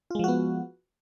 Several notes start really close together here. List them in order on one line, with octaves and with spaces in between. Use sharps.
F4 G#3 F3 F#4 B3